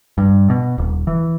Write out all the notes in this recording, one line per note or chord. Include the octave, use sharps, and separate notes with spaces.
G2
B2
D#1
E3